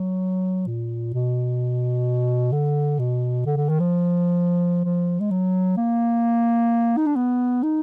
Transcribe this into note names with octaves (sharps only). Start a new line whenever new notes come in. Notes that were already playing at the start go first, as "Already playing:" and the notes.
Already playing: F#3
A#2
B2
D3
B2
D3
D3
D#3
F3
F3
G#3
F#3
A#3
D#4
D4
B3
D#4